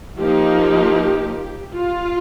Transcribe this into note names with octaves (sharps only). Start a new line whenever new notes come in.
F3 A#3 D#4 G4
F4